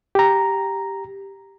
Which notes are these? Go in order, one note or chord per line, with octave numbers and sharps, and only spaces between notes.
G4 A#5